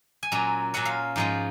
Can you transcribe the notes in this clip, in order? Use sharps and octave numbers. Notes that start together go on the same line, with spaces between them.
G#5
A#2 F#3 C#4 A#5
A#2 F#3 C#4 F#5
F5
G#2 F3 G#3 C#4